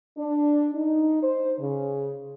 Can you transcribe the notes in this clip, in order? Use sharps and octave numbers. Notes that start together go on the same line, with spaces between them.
D4
D#4
C5
C#3